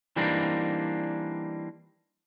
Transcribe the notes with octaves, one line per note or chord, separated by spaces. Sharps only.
E3 G3 A#3 C4 D4 D#4